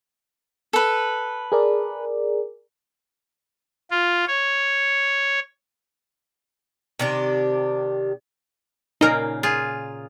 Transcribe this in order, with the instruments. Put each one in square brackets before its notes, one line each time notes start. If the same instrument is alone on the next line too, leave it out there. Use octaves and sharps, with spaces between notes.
[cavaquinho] A4 B4
[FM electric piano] G#4 A#4 D5
[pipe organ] F4
C#5
[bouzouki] C3 D#3 D4 G4
[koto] A#2 C#3 A#3 [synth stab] D#4 A#4
[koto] F4 G#4